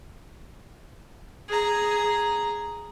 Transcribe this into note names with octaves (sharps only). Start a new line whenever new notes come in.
G#4 A#5